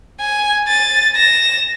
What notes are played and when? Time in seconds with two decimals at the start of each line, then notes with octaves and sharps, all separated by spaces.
0.21 G#5
0.68 A6 D#7
1.16 A#6 E7